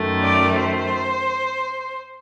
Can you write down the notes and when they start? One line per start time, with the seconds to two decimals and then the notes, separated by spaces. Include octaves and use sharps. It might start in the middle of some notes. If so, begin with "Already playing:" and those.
Already playing: F#2 D#3 A3
0.24 D5
0.62 C5